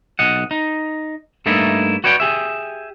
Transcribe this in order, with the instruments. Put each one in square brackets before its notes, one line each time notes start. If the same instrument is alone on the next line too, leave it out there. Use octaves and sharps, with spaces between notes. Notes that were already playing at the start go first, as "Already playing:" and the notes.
[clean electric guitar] B1 D#5 F#5
D#4
G2 A3 A#3 D#4 E4
F#4 B4 C#5 D5 F#5 G5
G4 G#4 E5